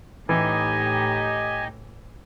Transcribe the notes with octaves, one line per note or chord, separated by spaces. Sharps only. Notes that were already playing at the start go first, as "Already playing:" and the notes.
A2 E3 D#4 G4 D#5 G#5